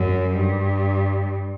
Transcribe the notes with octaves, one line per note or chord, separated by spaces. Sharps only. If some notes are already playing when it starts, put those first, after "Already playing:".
Already playing: F#2
G2